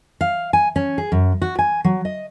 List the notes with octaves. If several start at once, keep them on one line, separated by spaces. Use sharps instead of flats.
F5
G#5
C#4
G#4
F#2
F#4
G#5
F#3
D#5